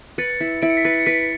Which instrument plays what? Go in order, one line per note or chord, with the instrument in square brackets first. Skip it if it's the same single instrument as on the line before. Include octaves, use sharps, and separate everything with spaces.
[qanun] B4 [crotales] A6 C#7
[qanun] E4
[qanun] E4 [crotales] D7
[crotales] C#7
B6
[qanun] B4 [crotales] A6 C#7
[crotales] C#7
[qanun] B4 [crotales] B6 D7